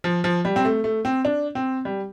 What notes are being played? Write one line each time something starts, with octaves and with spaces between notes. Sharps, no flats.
F3
F3
G3
C4
A3
A3
C4
D4
C4
G3